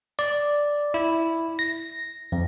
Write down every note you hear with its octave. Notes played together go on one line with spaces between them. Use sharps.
D5
E4
A#6
F2